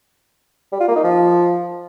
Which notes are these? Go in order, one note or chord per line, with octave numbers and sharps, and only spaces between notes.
G3
F4
A#3
D#4
F3